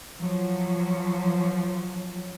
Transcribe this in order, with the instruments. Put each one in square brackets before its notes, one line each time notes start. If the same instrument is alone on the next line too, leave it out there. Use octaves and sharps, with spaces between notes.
[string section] F3 F#3